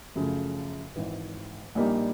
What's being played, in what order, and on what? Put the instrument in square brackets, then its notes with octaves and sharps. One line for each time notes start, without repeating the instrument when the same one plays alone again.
[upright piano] F#2 C#3 F3 A3
G#1 G#2 E3
A#1 A#2 G3 A#3 D#4